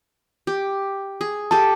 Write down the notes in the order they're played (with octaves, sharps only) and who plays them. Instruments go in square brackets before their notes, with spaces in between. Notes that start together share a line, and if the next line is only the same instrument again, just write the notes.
[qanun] G4
G#4
[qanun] G4 A4 [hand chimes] A5